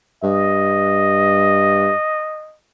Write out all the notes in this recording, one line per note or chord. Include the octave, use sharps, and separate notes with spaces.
G2 D#5